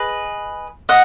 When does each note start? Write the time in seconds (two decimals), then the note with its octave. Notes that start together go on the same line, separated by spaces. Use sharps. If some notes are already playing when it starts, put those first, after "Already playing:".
Already playing: G#4 B4 D#5
0.89 D#5 F#5